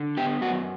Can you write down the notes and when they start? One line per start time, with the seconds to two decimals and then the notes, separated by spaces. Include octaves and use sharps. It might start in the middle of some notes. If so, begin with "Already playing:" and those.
Already playing: D3
0.17 B3 G4
0.41 F#2 F#4